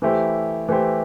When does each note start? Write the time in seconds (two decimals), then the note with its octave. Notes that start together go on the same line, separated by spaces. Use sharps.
0.02 E3 A3 E4 G4 C5
0.69 E3 A3 E4 G4 C5